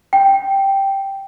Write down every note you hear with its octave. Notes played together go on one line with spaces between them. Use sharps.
G5